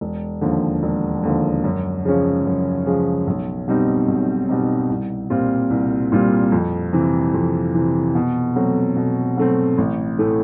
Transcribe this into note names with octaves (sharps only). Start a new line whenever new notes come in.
E1
D#2 D3 F3
E1
D#2 D3 F3
F#2
C#3 F3 G#3 C#4
F#2
C#3 F3 G#3 C#4
B1
B2 G3 C4 D#4
B1
B2 G3 C4 D#4
C2
A#2 G3 C4 F4
C2
A#2 G3 C4 F4
F2
C3 E3
F2
C3 E3
B2
F#3 A3 C4
B2
F#3 A3 C4
A1
A2 E3 A3